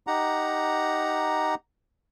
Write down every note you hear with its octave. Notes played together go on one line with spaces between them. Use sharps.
D#4 G4 F#5 A#5